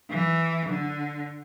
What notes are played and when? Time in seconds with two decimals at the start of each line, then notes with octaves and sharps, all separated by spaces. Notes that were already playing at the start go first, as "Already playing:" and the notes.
0.10 E3
0.69 D3